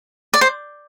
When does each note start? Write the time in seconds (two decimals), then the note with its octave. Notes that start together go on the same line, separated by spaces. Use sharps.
0.34 D5
0.41 C5